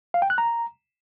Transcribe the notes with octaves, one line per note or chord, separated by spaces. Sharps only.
F5
G5
F#6
A#5